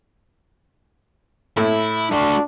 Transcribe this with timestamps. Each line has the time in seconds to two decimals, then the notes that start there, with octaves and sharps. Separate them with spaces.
1.57 A2 E4
2.11 A3 D4 F#4